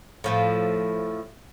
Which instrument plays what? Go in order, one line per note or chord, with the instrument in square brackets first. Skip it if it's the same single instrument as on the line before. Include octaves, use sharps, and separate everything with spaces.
[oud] A2 F3 A3